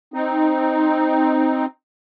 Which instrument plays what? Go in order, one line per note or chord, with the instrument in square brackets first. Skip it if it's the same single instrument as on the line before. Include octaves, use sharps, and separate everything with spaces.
[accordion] C4 D#4